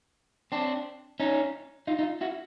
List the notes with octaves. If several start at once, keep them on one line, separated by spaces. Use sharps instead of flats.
C4 D4
C#4 D#4
D#4 F4
D#4 F4
E4 F#4